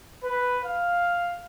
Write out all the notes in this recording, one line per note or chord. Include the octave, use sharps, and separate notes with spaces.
B4
F5